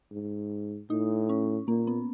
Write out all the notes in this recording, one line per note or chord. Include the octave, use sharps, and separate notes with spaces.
G#2
A2 D#4
C#4
A#2 A#3
B3